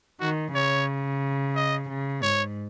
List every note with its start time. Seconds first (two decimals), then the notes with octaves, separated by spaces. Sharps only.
0.20 D#3 F#4
0.54 C#3 C#5
1.56 D#5
1.89 C#3
2.23 G#2 C#5